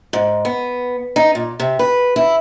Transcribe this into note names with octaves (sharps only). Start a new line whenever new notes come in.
G#2
B3
D#4
A#2
C3
B4
E4